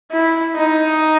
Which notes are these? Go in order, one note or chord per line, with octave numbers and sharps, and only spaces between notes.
E4
D#4